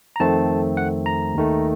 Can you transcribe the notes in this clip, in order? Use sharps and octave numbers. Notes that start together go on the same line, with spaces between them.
A#5
F2 D#3 A3 C4 A5
F#5
A#5
D#2 D#3 A3